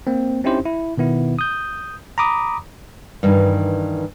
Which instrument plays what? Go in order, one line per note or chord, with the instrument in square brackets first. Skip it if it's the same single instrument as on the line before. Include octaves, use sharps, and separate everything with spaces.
[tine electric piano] A#3 C4
C4 C#4 D#4 E4 G4 C5
E4
B2 D#3 B3 E4
D#6 G6
A#5 B5 D6 D#6
[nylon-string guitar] G2 D#3 E3